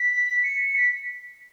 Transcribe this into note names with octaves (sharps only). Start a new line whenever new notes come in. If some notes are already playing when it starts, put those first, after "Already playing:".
Already playing: B6
C#7
B6